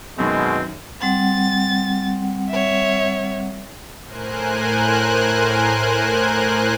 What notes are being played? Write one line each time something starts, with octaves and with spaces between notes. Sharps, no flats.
F#2 B2 D#3 G#3 C4
G3 C4 F#5 A6
C#5 E5
A2 A#4 C5 G#5 F#6